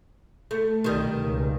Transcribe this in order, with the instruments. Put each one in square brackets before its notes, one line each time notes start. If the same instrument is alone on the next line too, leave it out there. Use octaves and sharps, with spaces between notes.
[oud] A3
[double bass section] C2 B2 [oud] D#3 G3
[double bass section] C#2